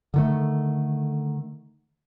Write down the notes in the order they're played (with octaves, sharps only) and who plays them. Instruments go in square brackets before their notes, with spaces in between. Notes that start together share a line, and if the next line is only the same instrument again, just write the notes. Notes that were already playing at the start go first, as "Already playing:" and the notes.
[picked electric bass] D3 D#3 A3